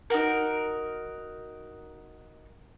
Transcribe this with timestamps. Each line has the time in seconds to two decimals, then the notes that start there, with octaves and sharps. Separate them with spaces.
0.10 D#4 F#4 A#4